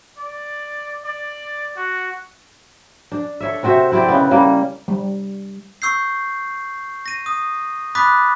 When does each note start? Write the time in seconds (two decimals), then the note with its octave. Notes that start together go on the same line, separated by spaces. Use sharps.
0.18 D5
1.05 D5
1.77 F#4
3.12 D4
3.41 A4 C#5 E5
3.63 C3 C4 F#4 E5
3.92 C4 E4 G4 D5
4.08 C#3 B3
4.31 C#3 G3 A#3
4.88 G3
5.82 C#6 E6 G6 C7
7.06 A#6 D#7
7.26 D#6
7.95 B5 D6 D#6 F#6 A6 B6